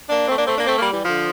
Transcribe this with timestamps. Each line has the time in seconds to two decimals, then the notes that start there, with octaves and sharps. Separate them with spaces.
0.09 A#3 D4
0.28 A3 C4
0.37 A#3 D4
0.47 A3 C4
0.57 A#3 D4
0.66 A3 C4
0.78 G3 A#3
0.92 E3 G3
1.04 D3 F3